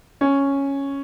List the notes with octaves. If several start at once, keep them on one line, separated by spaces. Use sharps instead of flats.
C#4